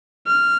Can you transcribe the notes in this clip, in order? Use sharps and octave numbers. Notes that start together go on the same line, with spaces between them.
F6